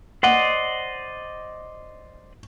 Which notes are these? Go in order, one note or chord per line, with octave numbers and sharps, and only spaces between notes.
C5 D5 D#5 F#5